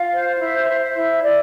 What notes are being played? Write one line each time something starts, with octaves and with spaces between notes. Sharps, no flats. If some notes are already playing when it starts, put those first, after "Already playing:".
Already playing: F4 F5
C5
E4 E5
C5
E5
E4
E4 D5